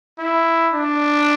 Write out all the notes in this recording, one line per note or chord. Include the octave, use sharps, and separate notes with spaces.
E4
D4